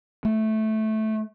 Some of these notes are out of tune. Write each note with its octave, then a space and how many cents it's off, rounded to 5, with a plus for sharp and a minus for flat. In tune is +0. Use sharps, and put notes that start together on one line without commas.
A3 -10